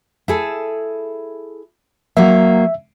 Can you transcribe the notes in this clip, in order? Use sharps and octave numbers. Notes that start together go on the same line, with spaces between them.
E4 G#4 A4
F#3 A#3 E5